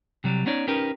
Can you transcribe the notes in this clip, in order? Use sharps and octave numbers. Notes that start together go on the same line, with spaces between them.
C3 F#3 G3
B3 C#4 D#4 C#5 D5
C#4 D#4 G4 A#4 B4